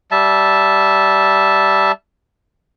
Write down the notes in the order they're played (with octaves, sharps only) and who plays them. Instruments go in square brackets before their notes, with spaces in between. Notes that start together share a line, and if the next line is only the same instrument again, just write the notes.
[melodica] G3 E5 A5